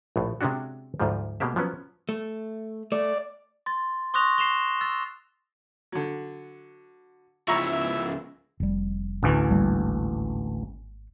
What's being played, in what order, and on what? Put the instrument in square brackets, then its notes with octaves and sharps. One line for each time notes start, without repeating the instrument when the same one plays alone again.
[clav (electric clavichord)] A#1 A2
C3 G#3 C#4 D4 F#4
D2 G#2 F3 G3
B2 G#3 A#3 G4 E5
F3 F#3 B3 C#4
[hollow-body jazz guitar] A3
[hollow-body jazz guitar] A3 [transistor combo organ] D5
[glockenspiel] C6 A6
C6 C#6 D#6 F#6 A#6 F7
C7 E7 F7 G7
E6 A6
[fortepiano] D3 F#3
[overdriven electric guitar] C#2 F3 [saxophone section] E4 E5 [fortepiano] A#5 C#6
[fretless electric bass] F1 G3
[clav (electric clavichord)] A1 D2 E3
[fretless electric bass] G#1 G3 A#3